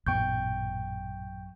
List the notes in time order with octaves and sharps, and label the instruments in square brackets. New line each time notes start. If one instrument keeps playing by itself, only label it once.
[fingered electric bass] A1 A#2 B3 [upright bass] F#2 [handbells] G5 C#6 G6